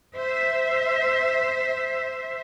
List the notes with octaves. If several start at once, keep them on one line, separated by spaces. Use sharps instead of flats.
C5 E5